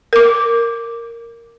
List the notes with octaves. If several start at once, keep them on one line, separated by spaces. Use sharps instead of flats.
A#4 D6